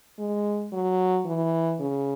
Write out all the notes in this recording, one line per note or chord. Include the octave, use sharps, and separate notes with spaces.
G#3
F#3
E3
C#3